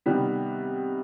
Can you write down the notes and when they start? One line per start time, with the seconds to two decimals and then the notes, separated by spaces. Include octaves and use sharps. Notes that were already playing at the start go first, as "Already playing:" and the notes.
0.06 C3 D#3 G3 B3